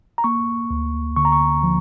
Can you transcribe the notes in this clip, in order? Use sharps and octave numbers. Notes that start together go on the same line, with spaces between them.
A#5
A#3 C#6
D2
D3 C#6
A#5
C#6
F3